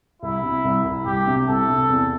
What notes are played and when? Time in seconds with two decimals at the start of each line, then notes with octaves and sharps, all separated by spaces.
0.22 C2 E4
0.43 C3
0.65 C2
0.85 C2
1.06 C2 G4
1.27 C3
1.48 C2 A4
1.69 C3
1.90 E2